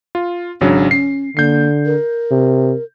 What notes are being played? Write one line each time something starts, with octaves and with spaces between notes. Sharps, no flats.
F4
G#1 C#3 F#3 D4
C#4 C7
D3 A#3 G6 C7
A#4
C3